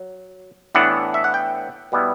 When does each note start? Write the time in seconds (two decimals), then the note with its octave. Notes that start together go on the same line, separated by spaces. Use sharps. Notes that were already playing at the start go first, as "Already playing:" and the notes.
Already playing: F#3
0.75 A2 E3 B3 D4 F#5
1.14 E5
1.24 F#5
1.34 G5
1.92 B2 G3 B3 E4